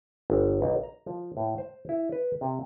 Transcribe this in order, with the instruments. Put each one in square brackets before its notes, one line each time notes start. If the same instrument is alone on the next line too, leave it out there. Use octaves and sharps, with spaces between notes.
[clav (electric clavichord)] G1
B1
A#5
F3
A2
C5
E4
B4
C3